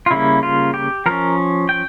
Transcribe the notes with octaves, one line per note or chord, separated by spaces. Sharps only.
F4
C#3 G3 A#3 E4
F4
G4
F3 C#4 A#4
G5